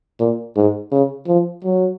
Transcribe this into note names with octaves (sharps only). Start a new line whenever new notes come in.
A#2
G#2
C#3
F3
F#3